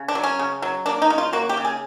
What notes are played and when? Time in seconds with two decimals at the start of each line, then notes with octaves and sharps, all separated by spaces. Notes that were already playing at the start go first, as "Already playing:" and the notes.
Already playing: C#3
0.08 D4
0.15 F#3
0.23 C#4
0.39 C#3
0.62 F#3
0.86 A#3 D4
1.02 D#4
1.10 C#3
1.18 F4
1.33 A#3 F#4
1.49 G4
1.57 C#3
1.65 G#4